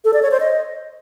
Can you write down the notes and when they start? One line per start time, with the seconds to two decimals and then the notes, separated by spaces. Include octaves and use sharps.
0.05 A4
0.13 D5
0.22 C#5
0.31 C5
0.40 D#5